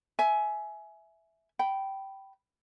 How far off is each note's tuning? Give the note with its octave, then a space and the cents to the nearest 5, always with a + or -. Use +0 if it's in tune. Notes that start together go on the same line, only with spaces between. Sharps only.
E5 +0 G#5 +20
G5 -15 B5 +0